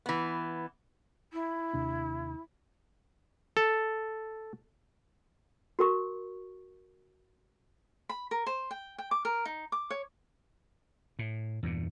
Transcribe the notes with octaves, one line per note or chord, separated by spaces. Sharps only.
E3 B3
E4
D#2 C3 D4
A4
F#4 A#4 C#6
B5
A#4
C5
G5
G5
D6
A#4
D#4
D6
C#5
A2
E2 G2 A#2